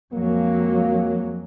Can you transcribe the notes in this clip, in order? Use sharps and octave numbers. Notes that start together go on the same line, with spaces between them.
F2 F#3 G#3 A#3